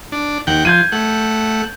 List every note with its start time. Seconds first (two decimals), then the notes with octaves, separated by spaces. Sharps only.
0.12 D4
0.47 D#2 F#5 G5
0.65 F3 G6 G#6 D#7
0.92 A3 F#5